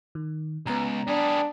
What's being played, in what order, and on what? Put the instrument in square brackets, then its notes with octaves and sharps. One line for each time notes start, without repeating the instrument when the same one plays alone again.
[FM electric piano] D#3
[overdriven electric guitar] C#2 [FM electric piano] B3 A#5
[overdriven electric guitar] G3 G#4 [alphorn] D4